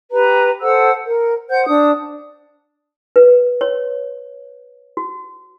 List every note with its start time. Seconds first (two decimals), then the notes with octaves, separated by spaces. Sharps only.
0.11 G4 B4 A#5
0.61 A4 C5 F#5 E6
1.07 A#4
1.49 C5 F#5 G6
1.67 D4 D#6
3.16 B4
3.61 C#5
4.97 F#4